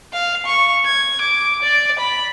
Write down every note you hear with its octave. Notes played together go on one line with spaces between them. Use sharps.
F5
C#6
G#6
D6
D5
B5